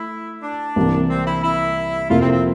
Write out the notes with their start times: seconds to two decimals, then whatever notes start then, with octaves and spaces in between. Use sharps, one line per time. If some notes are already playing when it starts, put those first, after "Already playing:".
Already playing: A3 E4
0.43 D4
0.76 C2 C3 E3 A#3
1.09 C4
1.26 E4
1.43 E4
2.10 F2 C3 F3 A#3 E4 F4
2.21 C4
2.32 C4